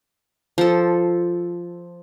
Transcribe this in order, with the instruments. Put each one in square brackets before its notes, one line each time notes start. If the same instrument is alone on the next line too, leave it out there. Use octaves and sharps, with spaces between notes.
[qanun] F3 A4